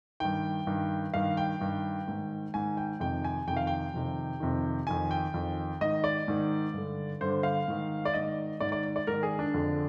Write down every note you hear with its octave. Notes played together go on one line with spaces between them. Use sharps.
G2 D#3 G5
G2 D#3
G2 D#3 F5
G5
G2 D#3
G#2 D#3
G#2 D#3 G#5
G5
F2 C3 D#3 G5
G#5
F2 C3 D#3 G5
F5
G5
F2 C3 D#3
F2 C3 D#3
F2 D#3 G#5
G5
F2 D#3
G#2 D#3 D#5
D5
G#2 D#3
G2 D3
G2 D3 C5
F5
G#2 D#3
D5
G#2 D#3 D#5
G#2 D#3 D5
D5
D5
G#2 D#3 A#4
G#4
D4
F2 D3